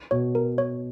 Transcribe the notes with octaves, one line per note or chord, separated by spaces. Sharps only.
B2 C#5
A#4
C#5